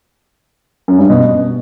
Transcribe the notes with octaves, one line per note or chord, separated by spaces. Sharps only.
F#2
G2
B2